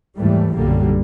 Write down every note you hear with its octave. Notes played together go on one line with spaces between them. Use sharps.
D#2 G#2 E3 G3 A3
B1 F#2 A#2 D3 G3 A#3